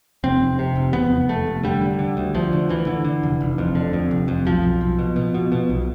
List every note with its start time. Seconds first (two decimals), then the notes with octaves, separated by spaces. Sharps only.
0.24 F1 C4
0.40 F1
0.59 C3
0.76 F1
0.93 E2 B3
1.11 F1
1.28 F1 A3
1.47 F1
1.64 D3 G3
1.81 D3
1.99 D3
2.17 D2
2.34 D2 F3
2.53 D3
2.69 D2 E3
2.87 D3
3.04 D3
3.23 F1
3.41 F1
3.58 F2
3.75 D3
3.93 F2
4.11 F1
4.28 F2
4.46 B1 F3
4.63 B1
4.81 B1
4.99 B2
5.16 B2
5.34 B2
5.52 B2
5.69 B1